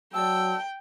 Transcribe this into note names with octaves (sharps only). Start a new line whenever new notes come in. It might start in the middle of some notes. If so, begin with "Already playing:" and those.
F#3 D5 G5 A5 E6